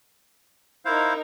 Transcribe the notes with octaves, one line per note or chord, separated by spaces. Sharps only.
D#4 E4 A#4 C5 F5